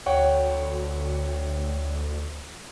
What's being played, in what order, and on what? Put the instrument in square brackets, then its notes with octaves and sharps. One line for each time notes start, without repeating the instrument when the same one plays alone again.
[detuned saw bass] D2 [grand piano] C#5 F#5 G5